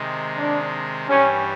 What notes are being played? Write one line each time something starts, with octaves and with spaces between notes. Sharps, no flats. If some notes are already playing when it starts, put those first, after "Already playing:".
Already playing: C3 D#3 G#3
D4
G2 E3 G3 C#4